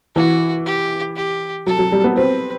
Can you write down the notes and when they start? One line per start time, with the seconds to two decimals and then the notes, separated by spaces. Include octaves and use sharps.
0.16 E3 F#4
0.66 G4
1.16 G4
1.67 F#3 A4
1.79 F#3
1.92 G3
2.04 B3
2.17 C4 B4